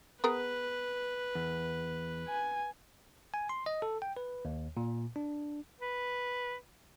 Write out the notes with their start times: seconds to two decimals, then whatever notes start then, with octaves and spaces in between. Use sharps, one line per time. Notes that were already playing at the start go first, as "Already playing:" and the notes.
0.24 B3 G#4 A#4 B4
1.35 E2
2.28 G#5
3.34 G#5
3.49 C6
3.66 D#5
3.82 A4
4.02 G5
4.17 B4
4.45 D#2
4.77 A#2
5.16 D4
5.80 B4